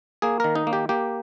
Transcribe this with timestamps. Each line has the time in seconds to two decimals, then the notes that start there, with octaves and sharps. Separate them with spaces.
0.22 A#3 G#4
0.40 D#3 A#4
0.55 D#4
0.67 A#3
0.73 G4
0.89 A#3 G4